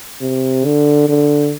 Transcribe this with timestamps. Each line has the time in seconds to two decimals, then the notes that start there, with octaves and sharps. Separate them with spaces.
0.21 C3
0.65 D3
1.08 D3